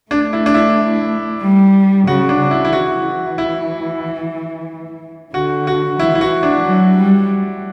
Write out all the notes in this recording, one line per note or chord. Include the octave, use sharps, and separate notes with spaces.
A3 D4
E4
D4
E4
G3
C#3 F#4
D4
C#3
E4
E4
E3 F#4
E4
D3 F#4
F#4
E3 E4
E4
F#4
D4
F#3
G3